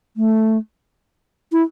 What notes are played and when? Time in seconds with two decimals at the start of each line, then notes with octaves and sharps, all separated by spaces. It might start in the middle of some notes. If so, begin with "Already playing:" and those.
0.17 A3
1.52 E4